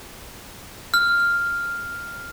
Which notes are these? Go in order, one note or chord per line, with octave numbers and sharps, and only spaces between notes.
F6